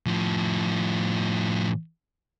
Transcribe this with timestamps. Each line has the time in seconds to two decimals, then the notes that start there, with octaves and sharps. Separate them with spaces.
0.06 A2 F3